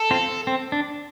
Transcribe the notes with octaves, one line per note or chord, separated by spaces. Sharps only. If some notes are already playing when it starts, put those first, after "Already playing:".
Already playing: A4
C4 F4
C4
D4